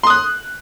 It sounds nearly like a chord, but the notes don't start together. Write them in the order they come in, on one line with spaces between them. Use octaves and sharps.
C6 D#6 F#6